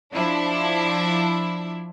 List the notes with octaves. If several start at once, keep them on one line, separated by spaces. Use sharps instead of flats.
F3 D4 E4